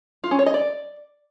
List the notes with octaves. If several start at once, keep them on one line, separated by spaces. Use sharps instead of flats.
F4
C#4
C#5
D#5
D5